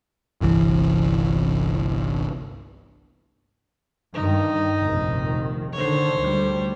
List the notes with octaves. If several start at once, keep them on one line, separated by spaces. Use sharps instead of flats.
G1 C2 E3
G2 D#3 D#4
F1 A#1 D#3
D3 D#3 C5 C#5
D2 G3